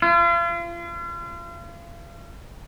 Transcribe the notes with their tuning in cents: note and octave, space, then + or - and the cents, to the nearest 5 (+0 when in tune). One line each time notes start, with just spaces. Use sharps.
F4 -40